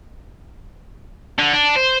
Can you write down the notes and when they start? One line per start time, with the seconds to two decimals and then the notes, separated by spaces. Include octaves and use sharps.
1.39 D3
1.53 D4
1.75 C5